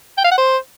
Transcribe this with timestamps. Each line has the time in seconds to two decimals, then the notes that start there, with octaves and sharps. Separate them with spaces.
0.18 G5
0.24 F5
0.31 F#5
0.38 C5